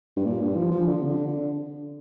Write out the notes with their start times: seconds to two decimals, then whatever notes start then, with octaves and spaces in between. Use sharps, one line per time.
0.16 G2
0.25 A#2
0.41 G2
0.56 F3
0.71 F3
0.87 D3
1.02 C3
1.06 D3
1.28 D3